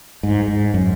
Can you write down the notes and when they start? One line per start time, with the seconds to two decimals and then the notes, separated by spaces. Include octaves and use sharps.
0.23 G#2
0.48 G#2
0.74 F#2